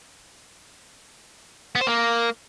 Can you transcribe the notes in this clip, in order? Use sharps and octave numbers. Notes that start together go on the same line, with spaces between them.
B3
C5
A#3